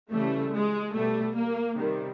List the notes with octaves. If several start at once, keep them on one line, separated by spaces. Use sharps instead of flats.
C#3 E3 G3 A3
G#3
B2 G3 A3
A#3
C3 D#3 G3